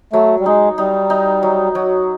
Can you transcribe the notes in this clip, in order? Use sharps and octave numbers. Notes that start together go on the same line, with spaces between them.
F#3 A3
G3
G#3 D#4
G3 D#4
D#4
F#3
F#3